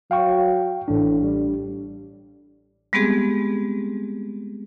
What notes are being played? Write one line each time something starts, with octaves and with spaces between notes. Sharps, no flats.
F#3 F5 G5 C#6
A1 A2 D4
G3
G3 G#3 B3 C4 G4 G#4